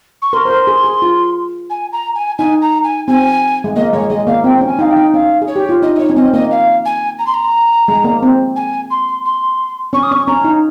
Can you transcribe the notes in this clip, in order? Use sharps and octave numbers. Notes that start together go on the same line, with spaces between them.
C#6
A#4 C6
C5
A#4
G#4
G#4
F4
G#5
A#5
G#5
D#4 G#5
A#5
G#5
C4 G#5
G#3
A#3 D#5
G#3 C#5
G#3 D#5
A#3 F5
C4 G5
C#4
G#5
D#4 F5
G5
D#4
C#4 F5
G#4
C#5
G4
F4
D#4 D#5
D#5
D#4 C#5
C#4
C4 D#5
A#3 D#5
F5
G#5
A#5
C6
A#5
G#3
A#3
C4
G#5
C6
C6
C#4 C#6
D#6
C#4 C#6
C#4 A#5
D#4